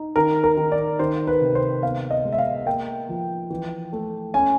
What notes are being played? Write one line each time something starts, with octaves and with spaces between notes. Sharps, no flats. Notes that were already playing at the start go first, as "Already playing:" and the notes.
Already playing: D#4
D#3 A#4
A#4
D#3
D5
D#3 C5
B4
C3
C5
B3 F5
D#5
G#3
E5
F5
A#3 G5
F3
E3
A3
C#4 G#5